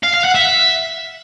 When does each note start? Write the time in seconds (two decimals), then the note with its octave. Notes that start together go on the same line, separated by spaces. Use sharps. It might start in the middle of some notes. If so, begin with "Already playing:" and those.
0.03 F5
0.14 F5
0.24 F#5
0.35 E5